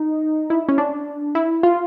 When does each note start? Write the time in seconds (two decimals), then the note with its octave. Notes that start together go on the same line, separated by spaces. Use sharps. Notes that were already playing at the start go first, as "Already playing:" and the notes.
Already playing: D#4
0.50 E4
0.69 C#4
0.78 D4
1.35 E4
1.63 F4